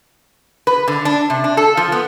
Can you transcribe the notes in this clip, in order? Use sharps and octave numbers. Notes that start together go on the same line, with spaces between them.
B4
D3
D4
C3
D4
A4
F3
B3